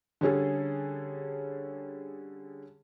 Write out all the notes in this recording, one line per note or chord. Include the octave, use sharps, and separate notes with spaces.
D3 G3 C#4 G#4 A4